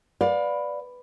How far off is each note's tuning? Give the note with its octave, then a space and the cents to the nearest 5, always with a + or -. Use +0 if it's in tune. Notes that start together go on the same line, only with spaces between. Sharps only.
B4 +5 D5 +0 F5 +35